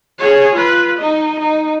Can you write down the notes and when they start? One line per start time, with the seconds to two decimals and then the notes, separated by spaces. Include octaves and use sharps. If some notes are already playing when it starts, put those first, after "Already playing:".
0.19 G#4 C#5
0.55 F4 B4
0.97 D#4 D#5
1.39 D#4